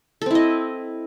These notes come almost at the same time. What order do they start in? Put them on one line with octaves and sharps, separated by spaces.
A4 C4 E4 D#5